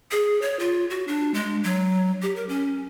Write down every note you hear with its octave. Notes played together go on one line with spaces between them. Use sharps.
G#4
C#5
F4
F#4
D4
G#3
F#3
G4
A#4
C#4